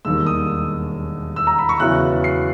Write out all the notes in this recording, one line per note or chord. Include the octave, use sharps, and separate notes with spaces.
E1 D#2 D#3 G3 E6
D#6
E6
A#5
B5
C#6
E2 C#3 F#3 B3 E4 F#6
C7